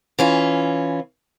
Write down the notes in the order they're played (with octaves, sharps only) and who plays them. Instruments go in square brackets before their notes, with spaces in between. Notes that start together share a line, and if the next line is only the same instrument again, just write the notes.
[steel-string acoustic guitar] E3 C#4 F4